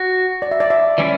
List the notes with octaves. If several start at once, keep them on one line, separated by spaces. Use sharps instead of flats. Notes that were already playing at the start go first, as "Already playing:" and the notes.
Already playing: F#4
D5
E5
D5
E5
E3 G3 C#4 E4 D5